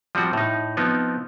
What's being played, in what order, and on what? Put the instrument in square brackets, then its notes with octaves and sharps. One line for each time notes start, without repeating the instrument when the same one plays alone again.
[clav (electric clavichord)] F3 G3 C4 F#4
A2 D#4
F3 B3 C4 D#4